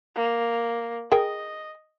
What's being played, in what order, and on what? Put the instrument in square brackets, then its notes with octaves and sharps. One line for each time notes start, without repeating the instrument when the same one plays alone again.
[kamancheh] A#3
[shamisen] G#4 A#4 G5 [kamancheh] D#5